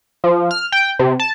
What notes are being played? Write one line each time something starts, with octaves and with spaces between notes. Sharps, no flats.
F3
F6
G5
C3
A5